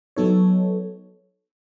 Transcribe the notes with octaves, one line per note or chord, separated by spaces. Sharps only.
F#3 B3 D#4 A4 C#5